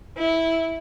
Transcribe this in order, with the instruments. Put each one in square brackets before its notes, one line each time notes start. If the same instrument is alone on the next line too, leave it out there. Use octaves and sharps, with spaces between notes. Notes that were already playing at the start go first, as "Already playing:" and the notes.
[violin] E4